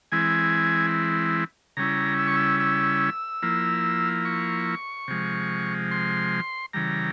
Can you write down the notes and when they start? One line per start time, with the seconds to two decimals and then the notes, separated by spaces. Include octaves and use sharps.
0.12 E3 G#3 C4 E4 G#5
1.77 C#3 G3 C#4 E4 A#5
2.19 E6
2.27 C#6
2.36 E6
2.60 E6
3.42 F3 A#3 E4
4.25 C#6
5.08 C3 F3 G#3
5.91 C6
6.73 C#3 E3 G3 A#5